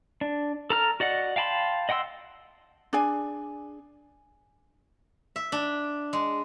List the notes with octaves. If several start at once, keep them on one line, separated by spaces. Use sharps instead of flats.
D4
A4 A#5 F6
F#4 D5 D#5 F#5
F5 G5 A5 B5 C6
D#5 F#5 G5 C6 E6
D4 G#4 D5 G#5
E5
D4
G#3